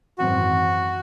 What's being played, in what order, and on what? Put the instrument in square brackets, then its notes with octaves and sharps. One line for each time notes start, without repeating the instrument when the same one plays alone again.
[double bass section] G#1 F#2 E3 C4 [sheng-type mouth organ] F#4